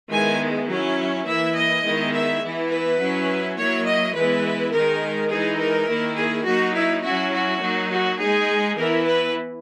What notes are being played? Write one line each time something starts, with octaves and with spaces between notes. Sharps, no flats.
D#3 G#3 B3 E4 G#5
F#3 C#4 E4
E3 A#3 E4 E5
D#5
D#3 G#3 B3 E4
E5
E3 B3 E4
B4
F#3 C#4 E4
F#3 A#3 E4 C#5
D#5
E3 G#3 B3 E4 B4
D#3 G#3 D#4 A#4
E3 G#3 D#4 G#4
A#4
D#3 A#3 E4
G#4
F#3 A#3 D#4 F#4
E4
F#3 C#4 E4 F#4
F#4
F#3 A#3 D#4
F#4
G#3 D#4 G#4
E3 B3 E4 A#4
B4